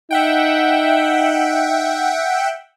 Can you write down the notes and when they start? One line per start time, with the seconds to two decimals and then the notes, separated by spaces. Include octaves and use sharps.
0.11 D#4 E5 F#5 G5